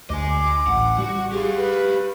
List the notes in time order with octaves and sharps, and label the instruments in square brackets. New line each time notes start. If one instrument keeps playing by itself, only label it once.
[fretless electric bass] D2 [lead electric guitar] D#5 G#5 [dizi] D6
[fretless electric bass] A1 [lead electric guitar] F#5
[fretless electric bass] G3 [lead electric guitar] F#4 F#5
[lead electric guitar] G4 F5 [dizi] G#4
[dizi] B4